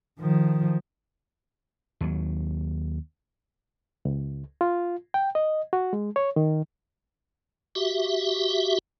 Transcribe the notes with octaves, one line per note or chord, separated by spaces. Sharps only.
D#3 F3
D#2 F#3
C#2
F4
G5
D#5
F#4
G#3
C#5
D#3
F#4 G4 E5